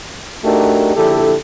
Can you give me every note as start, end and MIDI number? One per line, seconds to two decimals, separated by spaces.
0.44 0.95 57
0.44 0.95 62
0.44 0.95 63
0.44 0.95 66
0.44 0.95 67
0.44 0.95 70
0.96 1.34 34
0.96 1.34 50
0.96 1.34 64
0.96 1.34 67
0.96 1.34 69